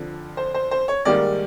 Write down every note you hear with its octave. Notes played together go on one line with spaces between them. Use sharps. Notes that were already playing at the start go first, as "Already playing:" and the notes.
Already playing: F2 D3 F3
C5
C5
C5
C#5
G#2 D#3 G3 A#3 D5